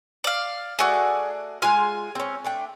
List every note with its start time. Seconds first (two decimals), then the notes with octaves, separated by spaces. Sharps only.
0.24 D5 F5
0.79 A3 F#4 G#4 D5 F#5
1.62 G#3 F4 G#5 F6
2.15 C4 C#4
2.44 A3 D4 G5